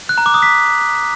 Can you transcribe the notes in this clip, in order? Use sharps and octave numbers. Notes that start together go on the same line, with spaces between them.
F#6
A#5
D6
D#6
B6